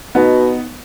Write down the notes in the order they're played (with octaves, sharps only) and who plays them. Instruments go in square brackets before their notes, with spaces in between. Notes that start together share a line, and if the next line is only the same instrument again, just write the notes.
[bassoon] B2 [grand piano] B3 D#4